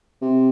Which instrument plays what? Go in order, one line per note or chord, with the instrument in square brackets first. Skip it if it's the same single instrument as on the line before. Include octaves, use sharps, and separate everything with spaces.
[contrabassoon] C3